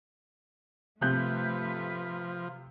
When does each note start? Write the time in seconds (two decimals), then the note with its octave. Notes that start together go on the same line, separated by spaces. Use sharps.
1.01 C3 F3 A3 B4 F#6 G6